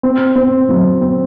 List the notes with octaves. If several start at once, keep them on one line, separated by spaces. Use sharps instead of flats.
C4
C4
F#3
C4